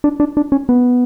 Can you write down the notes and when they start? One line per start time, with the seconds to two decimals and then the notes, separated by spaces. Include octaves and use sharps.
0.04 D4
0.20 D4
0.37 D4
0.52 C#4
0.69 B3